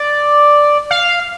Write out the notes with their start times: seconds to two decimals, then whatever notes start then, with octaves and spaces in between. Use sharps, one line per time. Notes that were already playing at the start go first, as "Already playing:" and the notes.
Already playing: D5
0.91 F5